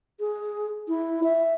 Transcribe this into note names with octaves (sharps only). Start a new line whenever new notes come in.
G#4
E4
E5